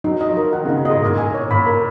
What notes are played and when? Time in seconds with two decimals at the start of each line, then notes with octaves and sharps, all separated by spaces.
0.04 F#3 D#4
0.21 D#5
0.29 F3
0.37 A#4
0.53 D#3 F#5
0.65 C#3
0.70 D#4
0.77 B2
0.85 G#2 D#5
1.02 A#2 A#4
1.18 G#5
1.35 C#5
1.51 A#2 B5
1.67 A#4